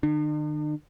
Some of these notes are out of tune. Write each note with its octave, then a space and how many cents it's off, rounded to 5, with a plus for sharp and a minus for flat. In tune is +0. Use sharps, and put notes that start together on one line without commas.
D#3 -45 D4 +45